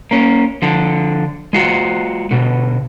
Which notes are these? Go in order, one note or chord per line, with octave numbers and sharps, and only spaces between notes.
A#3 C#4
D3 F3
G#3 F4 F#4
B2 D3